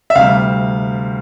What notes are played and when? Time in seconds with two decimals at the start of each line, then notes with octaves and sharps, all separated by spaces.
0.10 E5
0.15 D2 C3 G3 F5